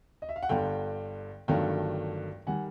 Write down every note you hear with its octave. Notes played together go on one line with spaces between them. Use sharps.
D#5
E5
F5
F#5
G1 G2 D3 F5 G5
G1 G2 D#3 F#3 A3 F5 G5
D#3 G3 F#5 G#5